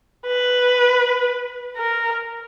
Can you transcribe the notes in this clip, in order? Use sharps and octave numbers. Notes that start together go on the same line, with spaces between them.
B4
A#4